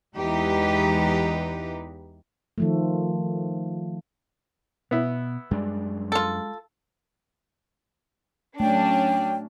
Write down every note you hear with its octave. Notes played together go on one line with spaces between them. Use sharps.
E2 E3 G#3 D#4 G4 B4
D#3 F3 A3
B2 B3 E4
F#2 G3 G#3 D4 G#4 D5
F4 A4
F#3 A3 C#4 D4 G5